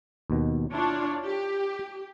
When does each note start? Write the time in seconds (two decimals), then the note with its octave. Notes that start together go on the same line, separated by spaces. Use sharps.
0.30 D#2 B2 D#3
0.73 D4 E4 F4 C#5
1.26 G4